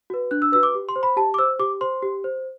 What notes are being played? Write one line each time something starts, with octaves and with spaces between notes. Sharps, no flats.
F#4 B4
D4 F#6
E6
F#4 B4 E6
D6
G4
C6
C5
B5
G4 A5
D6
C5 E6
G4 D6
C5 C6
G4
C5